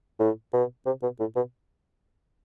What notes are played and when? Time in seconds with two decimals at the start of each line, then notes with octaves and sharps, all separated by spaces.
0.20 A2
0.53 B2
0.86 C3
1.02 B2
1.20 A2
1.36 B2